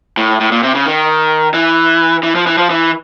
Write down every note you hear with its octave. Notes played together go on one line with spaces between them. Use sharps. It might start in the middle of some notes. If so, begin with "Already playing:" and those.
A2
A2
A#2
C3
C#3
D#3
E3
E3
F3
E3
F3
E3